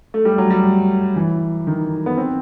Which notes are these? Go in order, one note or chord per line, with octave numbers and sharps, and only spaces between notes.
A3
G3
F#3
G3
E3
D#3
B3
C4